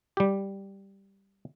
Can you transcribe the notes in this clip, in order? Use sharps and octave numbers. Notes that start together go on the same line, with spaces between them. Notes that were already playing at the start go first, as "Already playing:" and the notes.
G3 G4